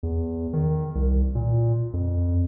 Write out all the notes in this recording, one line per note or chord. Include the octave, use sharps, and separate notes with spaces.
E2
D#3
C2
A#2
F2